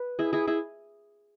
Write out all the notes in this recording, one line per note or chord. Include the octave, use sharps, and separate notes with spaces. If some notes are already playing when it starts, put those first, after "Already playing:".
Already playing: B4
E4 G#4
E4 G#4
E4 G#4